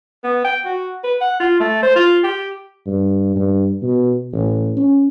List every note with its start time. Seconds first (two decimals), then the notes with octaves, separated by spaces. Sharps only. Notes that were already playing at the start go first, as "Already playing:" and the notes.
0.24 B3
0.45 G5
0.65 F#4
1.04 B4
1.21 F#5
1.40 F4
1.60 A3
1.83 C5
1.96 F4
2.24 G4
2.86 G2
3.36 G2
3.82 B2
4.33 A1
4.77 C#4